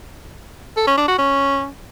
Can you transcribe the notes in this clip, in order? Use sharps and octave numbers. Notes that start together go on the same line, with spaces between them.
A4
C#4
D4
F#4
C#4